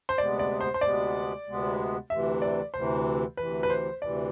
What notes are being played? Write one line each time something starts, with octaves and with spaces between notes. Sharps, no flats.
C5
D2 C3 G#3 B3 D5
D5
C5
C5
D2 C3 G#3 B3 D5
D2 C3 G#3 B3
D2 C3 E3 E5
D5
D2 C3 E3 C5
D2 C3 E3 B4
B4
C5
D2 C3 E3 D5